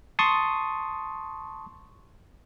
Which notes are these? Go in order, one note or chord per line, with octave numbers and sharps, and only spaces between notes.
A5 C6 C#6 D#6